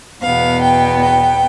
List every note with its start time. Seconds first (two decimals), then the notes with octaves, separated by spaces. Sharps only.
0.22 E2 B2 B3 F5
0.62 G5
1.01 G5